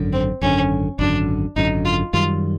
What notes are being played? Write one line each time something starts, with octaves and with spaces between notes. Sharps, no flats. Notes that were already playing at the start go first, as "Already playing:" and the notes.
Already playing: G#1 F#2 D3
C4
G#1 F#2 D3 C#4
G#1 F#2 D3 D4
G#1 F#2 D3 D#4
F4
F#2 D#3 G3 F4